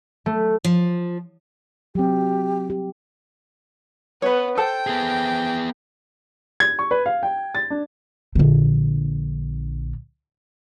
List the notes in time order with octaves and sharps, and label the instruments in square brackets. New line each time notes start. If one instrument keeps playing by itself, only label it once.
[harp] A3
[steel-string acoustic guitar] F3
[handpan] F#3 C4 [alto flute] G4
[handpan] G4
[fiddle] B3 [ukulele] B4 C#5
[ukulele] A4 C5 A5 [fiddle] G5
[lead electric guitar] B3 G#4
[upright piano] G#6
C#6
B4
F5
G5
A6
D4
[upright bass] A#1 D3